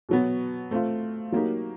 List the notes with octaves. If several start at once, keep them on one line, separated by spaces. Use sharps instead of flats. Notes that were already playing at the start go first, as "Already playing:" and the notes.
B2 F#3 B3
A3 C4 F4
F#3 A#3 D#4 G4 A#4